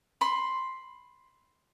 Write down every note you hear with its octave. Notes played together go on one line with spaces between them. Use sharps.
B5 C6